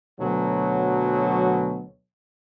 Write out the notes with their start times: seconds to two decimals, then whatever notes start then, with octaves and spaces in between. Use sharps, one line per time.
0.20 D2 B2 F#3